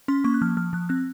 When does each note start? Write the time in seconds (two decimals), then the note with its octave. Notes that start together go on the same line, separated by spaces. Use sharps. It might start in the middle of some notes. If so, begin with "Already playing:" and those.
0.08 C#4 C6
0.24 A#3 C#6
0.34 F#6
0.41 F3 F6
0.57 F3 F6
0.73 F3 F#6
0.89 C4 F#6